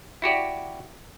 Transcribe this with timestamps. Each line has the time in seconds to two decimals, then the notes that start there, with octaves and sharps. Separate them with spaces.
0.22 E4 F#4 G4 D5